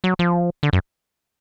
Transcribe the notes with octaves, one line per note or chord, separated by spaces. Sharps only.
F#3
F3
D3
F#2